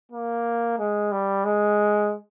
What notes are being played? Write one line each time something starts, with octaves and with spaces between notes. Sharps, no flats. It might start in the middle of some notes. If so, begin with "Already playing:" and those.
A#3
G#3
G3
G#3